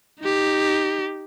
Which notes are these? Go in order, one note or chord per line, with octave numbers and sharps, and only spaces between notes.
D#4 G4